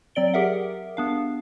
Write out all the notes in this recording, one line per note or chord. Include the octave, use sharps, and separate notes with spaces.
F#3 C4 D5 D7 G7
G4 G#4 A#4 E5 F#5
B3 D4 F5